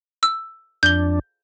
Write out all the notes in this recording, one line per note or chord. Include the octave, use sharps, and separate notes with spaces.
E6
F2 D4 G6 G7